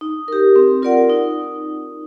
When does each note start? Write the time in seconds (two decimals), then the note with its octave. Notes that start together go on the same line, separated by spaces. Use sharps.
0.01 D#4
0.28 G4 A#4
0.56 C4
0.82 F4 A#4 D5 F#5
1.10 D#4